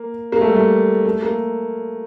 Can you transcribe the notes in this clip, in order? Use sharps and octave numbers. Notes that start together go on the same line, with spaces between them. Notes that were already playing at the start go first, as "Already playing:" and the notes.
Already playing: A#3
A#3
A3
G3
A3
A3
A#3